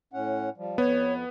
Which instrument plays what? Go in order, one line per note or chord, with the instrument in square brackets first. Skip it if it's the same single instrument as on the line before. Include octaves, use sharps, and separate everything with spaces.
[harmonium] A2 C#4 F#5
F3 G3
[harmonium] F2 [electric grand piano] B3 [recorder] C#5